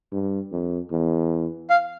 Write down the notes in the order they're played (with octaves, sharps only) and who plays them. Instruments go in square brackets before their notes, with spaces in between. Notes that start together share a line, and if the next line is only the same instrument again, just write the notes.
[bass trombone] G2
F2
E2
[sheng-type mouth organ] F5